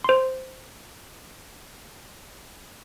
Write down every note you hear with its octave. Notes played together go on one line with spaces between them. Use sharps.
C5 C6